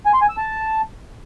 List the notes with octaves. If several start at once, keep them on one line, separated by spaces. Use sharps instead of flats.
G#5
C6
G#5
E6
A5